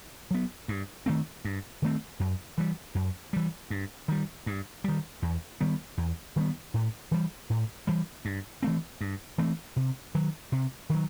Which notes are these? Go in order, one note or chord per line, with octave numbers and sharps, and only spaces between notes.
F#3 B3
G2
D#3 A3 C4
G2
D#3 A3 C4
F#2
E3 G3
F#2
E3 G3
G2
D#3 G3
G2
D#3 G3
E2
D#3 G3 B3
E2
D#3 G3 B3
A2
E3 G3
A2
E3 G3
G2
E3 A3 C4
G2
E3 A3 C4
C3
D#3 F#3
C3
D#3 F#3